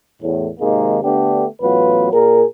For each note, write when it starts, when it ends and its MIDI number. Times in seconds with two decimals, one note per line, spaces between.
0.22 0.47 40
0.22 0.47 45
0.60 0.99 32
0.60 0.99 48
0.60 0.99 51
0.60 0.99 56
0.60 0.99 58
1.04 1.45 50
1.04 1.45 57
1.04 1.45 59
1.04 1.45 62
1.04 1.45 67
1.62 2.09 33
1.62 2.09 54
1.62 2.09 59
1.62 2.09 65
1.62 2.09 71
2.12 2.44 46
2.12 2.44 68
2.12 2.44 70